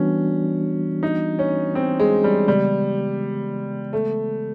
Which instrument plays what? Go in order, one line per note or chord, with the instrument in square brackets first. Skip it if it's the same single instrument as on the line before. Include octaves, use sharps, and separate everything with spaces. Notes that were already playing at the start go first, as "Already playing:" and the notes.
Already playing: [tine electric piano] E3 G3 B3 D4 F#4 [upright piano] C#4
[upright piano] D#4
C#4
C4
G#3
G3
[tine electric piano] C#3 E3 G#3 B3 [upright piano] G3
[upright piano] A3